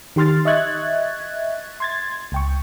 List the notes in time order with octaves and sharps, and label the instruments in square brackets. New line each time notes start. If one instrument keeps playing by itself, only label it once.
[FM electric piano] D#3 G4 C6 F6 A6
D#5 E5 C#6 F#6 G#6 A6
C6 G#6 A6
C#2 G5 C#6